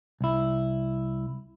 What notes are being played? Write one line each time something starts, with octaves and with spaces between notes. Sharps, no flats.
C2 E4